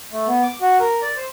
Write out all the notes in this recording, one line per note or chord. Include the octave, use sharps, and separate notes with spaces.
A3
B3
D6
F#4
A#4
D5
C5